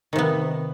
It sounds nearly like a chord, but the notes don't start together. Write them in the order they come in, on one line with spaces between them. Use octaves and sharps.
D#3 C3 B3